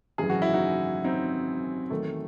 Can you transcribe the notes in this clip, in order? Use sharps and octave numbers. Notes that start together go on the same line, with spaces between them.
G#1 F#2 C#3 E3 G#4
F#4
E4
D#4 F#4
C4 D#4
E2 D#3 F#3 A3